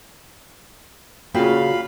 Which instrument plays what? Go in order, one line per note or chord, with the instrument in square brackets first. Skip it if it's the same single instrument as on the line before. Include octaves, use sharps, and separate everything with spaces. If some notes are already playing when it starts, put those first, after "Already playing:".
[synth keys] A#2 C#3 [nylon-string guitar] F4 F#4 G5 [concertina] F5 B5